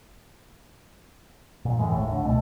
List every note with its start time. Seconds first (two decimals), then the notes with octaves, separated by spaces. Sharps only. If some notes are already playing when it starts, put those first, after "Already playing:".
1.65 A#2
1.79 F#2 A2 E3 G#3
1.91 G#1 D#2 A2
2.07 A2 D3
2.22 C#2 B2 G#3 A3